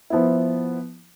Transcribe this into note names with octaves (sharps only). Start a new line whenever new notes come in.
F3 B3 E4